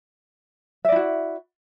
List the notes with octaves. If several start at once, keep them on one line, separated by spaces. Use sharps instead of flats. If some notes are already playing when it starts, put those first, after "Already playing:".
E4 F#4 D5 E5